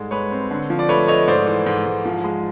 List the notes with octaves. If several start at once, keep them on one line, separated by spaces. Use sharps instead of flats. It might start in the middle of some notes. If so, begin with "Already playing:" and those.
Already playing: G#2 G3 G#3 A4
G#3 B4 C#5
C4
D3
F3
D5
A3 B4 C#5
A3 C#5 D#5
G#2 C5 D5
E3
G#2
G#2
F3
G#3